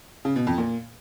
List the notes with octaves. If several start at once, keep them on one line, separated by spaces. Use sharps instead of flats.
C#3
B2
F2
A#2